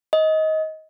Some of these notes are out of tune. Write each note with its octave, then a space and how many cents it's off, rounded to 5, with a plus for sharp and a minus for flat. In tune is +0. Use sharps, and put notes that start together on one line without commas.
D#5 +20